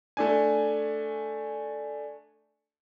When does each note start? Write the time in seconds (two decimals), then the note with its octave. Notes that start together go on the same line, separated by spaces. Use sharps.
0.17 A3 D4 G#5